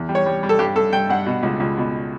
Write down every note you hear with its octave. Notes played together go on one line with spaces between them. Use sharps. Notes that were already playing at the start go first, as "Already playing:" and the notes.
Already playing: E2
G3
C#5
G3
G3
A4
G2 G4
G2 A4
G2 G5
G2 F#5
B2
C#2
C#2
B2